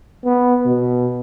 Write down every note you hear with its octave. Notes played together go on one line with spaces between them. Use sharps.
B3
B2